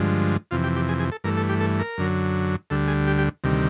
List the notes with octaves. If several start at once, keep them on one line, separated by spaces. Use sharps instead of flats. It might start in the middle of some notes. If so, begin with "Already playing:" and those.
Already playing: G2 D3 F3 G#3
F2 C3 E3 F4
G4
G4
G#4
G#4
A4
G2 E3 A3 A#4
A4
G4
A4
A#4
F#2 D3 F#3
D2 D3 G3 A4
G#4
G4
G4
D2 C3 D#3 G3